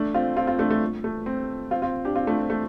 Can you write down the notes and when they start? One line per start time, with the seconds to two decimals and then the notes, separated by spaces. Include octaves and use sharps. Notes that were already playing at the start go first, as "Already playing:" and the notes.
Already playing: A3 D4
0.14 C4 F4
0.36 C4 F4
0.47 C4 F4
0.59 A3 D4
0.71 A3
1.04 A3
1.26 C4
1.71 C4 F4
1.82 C4 F4
2.05 D4 G4
2.15 C4 F4
2.27 A3 D4
2.39 C4
2.50 A3